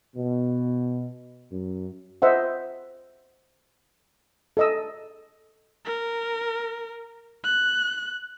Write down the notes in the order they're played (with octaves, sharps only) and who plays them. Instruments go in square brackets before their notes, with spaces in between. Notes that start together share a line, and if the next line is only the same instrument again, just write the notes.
[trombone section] B2
F#2
[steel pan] C5 D#5 E5 F#5
A4 D#5 E6
[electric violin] A#4
F#6